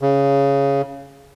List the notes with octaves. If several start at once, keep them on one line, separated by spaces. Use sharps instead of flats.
C#3